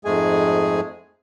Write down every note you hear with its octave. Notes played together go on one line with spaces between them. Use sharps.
F2 G#2 G#3 A3 G#4 G#5